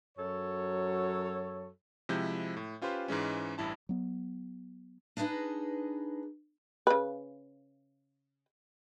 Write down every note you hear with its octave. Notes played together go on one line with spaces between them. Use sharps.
F#2 F#3 A4 C#5
C3 F3 G#3 E4 G6
A2
C#4 F4 G4 B4 C5
G#2 E3 G#3 C#4
A1 G2 E4 A5
F#3 B3
D4 D#4 G#4 B4 D#5
C#3 B4